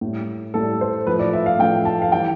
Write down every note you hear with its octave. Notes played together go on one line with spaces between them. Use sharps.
A2 G3
A2 G3 A4
C5
A2 F3 A3 B4
D5
E5
F5
A2 F3 A3 G5
A5
F5
E3 G3 G5